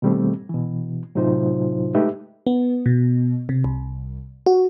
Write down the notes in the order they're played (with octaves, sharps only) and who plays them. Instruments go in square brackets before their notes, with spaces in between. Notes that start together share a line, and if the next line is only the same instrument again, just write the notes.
[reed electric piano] B2 D#3 G3 A3 C4
B2 E3
A2 C3 F#3 D#4 F4 C5
G#3 A3 D#4 G4 B4 E5
[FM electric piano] B3
B2
C3
C2
F#4